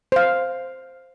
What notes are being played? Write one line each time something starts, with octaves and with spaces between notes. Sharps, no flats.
C5 F5